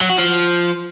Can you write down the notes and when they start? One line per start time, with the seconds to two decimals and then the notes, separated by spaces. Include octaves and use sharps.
0.01 F#3
0.10 F#4
0.18 F3